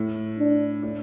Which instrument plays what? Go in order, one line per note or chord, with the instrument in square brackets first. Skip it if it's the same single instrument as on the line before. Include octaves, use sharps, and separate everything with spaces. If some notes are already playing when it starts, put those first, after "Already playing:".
Already playing: [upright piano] A2
[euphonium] D4
[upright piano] A2